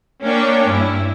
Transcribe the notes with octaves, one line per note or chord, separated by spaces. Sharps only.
A#3 C#4 D4 C#5 G5
G2 E4